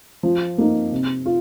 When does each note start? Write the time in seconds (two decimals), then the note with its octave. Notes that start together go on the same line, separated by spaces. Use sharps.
0.23 F3
0.58 A#3 D#4
0.92 C3
1.26 F4